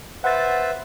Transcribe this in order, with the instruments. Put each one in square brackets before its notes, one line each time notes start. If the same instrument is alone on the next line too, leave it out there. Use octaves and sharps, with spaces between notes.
[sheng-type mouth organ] B4 C5 E5 [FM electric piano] F#5 A6